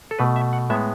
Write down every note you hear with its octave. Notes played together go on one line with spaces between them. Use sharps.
A4
B2 A3 B4
E5
F#5
A2 G#3 B3 E5